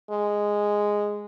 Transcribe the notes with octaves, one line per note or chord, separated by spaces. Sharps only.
G#3